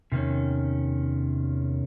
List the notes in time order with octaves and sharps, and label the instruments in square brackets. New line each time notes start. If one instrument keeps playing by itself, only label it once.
[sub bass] E2 [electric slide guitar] C3 D#3 C#4